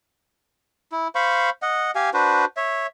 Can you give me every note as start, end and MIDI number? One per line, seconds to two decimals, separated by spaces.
0.92 1.08 64
1.15 1.50 72
1.15 1.50 77
1.15 1.50 83
1.15 1.50 85
1.62 1.91 75
1.62 1.91 78
1.95 2.10 67
1.95 2.10 77
1.95 2.10 80
2.14 2.45 62
2.14 2.45 66
2.14 2.45 71
2.14 2.45 72
2.57 2.87 73
2.57 2.87 76